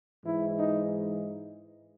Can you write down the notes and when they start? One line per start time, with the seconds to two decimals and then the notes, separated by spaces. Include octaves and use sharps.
0.24 G#2 E3 G#3 E4
0.58 D#4